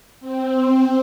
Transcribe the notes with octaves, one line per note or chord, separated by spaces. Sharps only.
C4